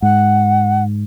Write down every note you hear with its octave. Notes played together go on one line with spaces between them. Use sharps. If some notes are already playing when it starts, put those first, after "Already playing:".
G#2 F#5